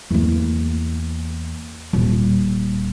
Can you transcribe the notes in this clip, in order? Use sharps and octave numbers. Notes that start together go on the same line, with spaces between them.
E2 A#3
D#1